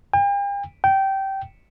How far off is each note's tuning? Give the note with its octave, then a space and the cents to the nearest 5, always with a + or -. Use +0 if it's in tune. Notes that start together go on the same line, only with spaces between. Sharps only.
G5 +45
G5 -15